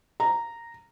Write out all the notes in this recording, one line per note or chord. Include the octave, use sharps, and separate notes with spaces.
A#5